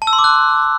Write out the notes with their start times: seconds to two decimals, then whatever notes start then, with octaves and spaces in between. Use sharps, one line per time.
0.02 A5
0.07 E6
0.13 C6
0.19 D6
0.24 F#6